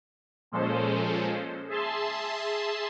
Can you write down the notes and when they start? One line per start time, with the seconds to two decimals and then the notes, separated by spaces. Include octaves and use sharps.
0.52 A#2 F3 G#3 C#4 A4 C5
1.69 G#4 E5 A5 C6